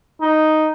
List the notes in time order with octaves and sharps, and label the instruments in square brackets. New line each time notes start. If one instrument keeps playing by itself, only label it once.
[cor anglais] D#4